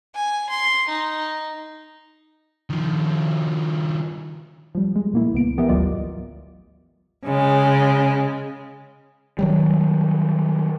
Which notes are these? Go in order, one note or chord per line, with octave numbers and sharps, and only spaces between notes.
G#5
C6
D#4
D#3 F3
F3 G3
G#3
A#2 A#3 E4
C#2 B3 D7
E3 B3 G4 A#4 E5
G#1 D2 F#3 F4 D5 D#5
C#3 G#3
D#3 F#3 G3